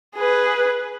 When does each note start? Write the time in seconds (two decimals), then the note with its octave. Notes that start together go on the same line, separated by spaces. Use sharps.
0.15 G#4 B4